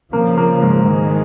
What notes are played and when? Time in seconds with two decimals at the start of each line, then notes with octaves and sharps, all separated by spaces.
0.13 C#3 F3 A#3
0.37 A#3
0.62 G#2
0.85 G#2 D#3 G#3